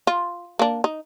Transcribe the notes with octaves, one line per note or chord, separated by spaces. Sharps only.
F4
A#3 D4
D#4